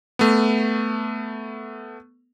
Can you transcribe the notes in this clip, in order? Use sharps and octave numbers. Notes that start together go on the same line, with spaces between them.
A3 B3